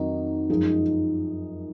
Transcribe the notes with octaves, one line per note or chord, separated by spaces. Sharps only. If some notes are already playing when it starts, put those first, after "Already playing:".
Already playing: F2 D#3 F#3 D#4
F#2 F3 G#3 D#4 G#4